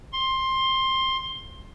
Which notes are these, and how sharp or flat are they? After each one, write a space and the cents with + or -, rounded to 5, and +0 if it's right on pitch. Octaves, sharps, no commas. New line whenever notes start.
C6 +15